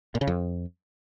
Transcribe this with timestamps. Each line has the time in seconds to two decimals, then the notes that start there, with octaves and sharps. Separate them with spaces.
0.15 A#2
0.21 C#3
0.27 F2